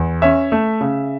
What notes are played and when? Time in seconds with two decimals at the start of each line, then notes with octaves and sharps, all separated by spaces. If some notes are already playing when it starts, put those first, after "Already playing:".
Already playing: E2
0.22 C#4 E5
0.52 A3
0.81 C#3